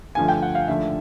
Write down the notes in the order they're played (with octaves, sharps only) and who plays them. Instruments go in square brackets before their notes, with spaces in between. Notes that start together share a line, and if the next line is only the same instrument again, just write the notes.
[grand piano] G2 D3 F3 A3 G#5
G5
F#5
F5
D#2 D3 F3 A3 E5